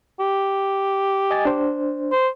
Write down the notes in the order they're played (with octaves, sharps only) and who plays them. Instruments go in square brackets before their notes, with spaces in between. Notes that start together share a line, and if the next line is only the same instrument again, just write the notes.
[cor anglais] G4
[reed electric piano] D#5 G#5 A6
D4 C5
[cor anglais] C5